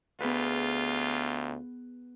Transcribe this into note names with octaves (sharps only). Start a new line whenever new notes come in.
D2 B3 F4 G#4 B4